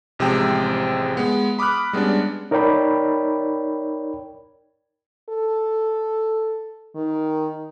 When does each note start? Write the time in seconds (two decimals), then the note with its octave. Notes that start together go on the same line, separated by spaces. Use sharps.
0.19 A1 C3 F3 G#3 G5
1.17 G#3 B3
1.59 B5 D6 D#6 F6 F#6
1.93 G3 G#3 B3 C#4 D4
2.51 D#4 A#4 C#5 D5 G5 B5
5.29 A4
6.95 D#3